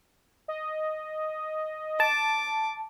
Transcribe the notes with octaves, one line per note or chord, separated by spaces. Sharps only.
D#5
A5 D6